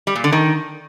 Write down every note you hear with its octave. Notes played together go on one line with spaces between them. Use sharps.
G3
A#2
D3
D#3